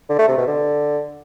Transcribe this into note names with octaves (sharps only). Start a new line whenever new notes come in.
D3
A3
C3
B2
D3